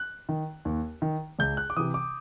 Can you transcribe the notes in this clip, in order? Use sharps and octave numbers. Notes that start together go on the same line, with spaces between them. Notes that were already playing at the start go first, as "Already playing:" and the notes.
Already playing: F#6
D#3
D#2
D#3
C#2 G6
F#6
D6
C3 E3 D#6
D6